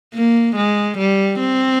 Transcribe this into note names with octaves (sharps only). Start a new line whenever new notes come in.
A#3
G#3
G3
C4